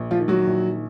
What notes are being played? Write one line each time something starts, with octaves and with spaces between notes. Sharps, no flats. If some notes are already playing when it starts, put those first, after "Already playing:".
Already playing: A#1
F3 F4
D#3
F#3 F#4
A#1